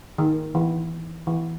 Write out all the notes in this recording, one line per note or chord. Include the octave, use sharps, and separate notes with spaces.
D#3
E3
E3